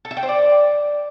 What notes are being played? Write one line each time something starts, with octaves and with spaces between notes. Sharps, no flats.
A4
E5
G5
C5
D5